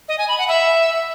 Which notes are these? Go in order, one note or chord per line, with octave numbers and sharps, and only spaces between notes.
D#5
G#5
B5
F#5
E5